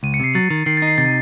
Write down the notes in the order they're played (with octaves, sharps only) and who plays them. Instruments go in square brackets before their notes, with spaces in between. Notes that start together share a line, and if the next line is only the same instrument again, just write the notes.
[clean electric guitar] C#2 [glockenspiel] D#7
[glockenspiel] C#7
[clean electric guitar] C3 [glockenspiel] C7
[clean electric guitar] F#3 [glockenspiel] A6
[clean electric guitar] D#3
[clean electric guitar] D#3 [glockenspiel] C7
[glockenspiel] A6
[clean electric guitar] D#4
[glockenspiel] C7
[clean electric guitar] C3 [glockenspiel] A6